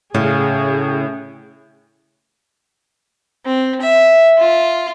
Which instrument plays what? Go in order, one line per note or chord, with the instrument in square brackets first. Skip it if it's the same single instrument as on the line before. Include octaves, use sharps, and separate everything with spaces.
[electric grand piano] A2 [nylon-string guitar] C#3 [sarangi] G#4
[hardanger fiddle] C4
E5
F4